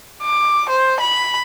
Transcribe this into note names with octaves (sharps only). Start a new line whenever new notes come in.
D6
C5
B5